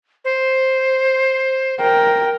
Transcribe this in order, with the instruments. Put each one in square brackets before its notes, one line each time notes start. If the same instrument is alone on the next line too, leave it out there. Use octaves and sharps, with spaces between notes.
[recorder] C5
[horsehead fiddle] A#4 G5